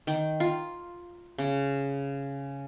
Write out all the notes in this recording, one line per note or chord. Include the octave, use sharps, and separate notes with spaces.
D#3
F4
C#3